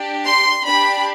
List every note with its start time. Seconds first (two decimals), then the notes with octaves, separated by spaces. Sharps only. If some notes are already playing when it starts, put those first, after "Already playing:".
Already playing: D4 G4
0.24 C6
0.65 D4 G4 B5